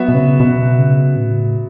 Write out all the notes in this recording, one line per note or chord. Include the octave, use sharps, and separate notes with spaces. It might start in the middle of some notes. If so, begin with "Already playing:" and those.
Already playing: F#3 B3 F#4 E5
B2
C#3
B2
C#3
A2